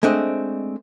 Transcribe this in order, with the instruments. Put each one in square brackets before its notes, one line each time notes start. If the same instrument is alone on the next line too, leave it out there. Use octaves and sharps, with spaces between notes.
[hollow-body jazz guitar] G#3 A3 C4 D4 D#5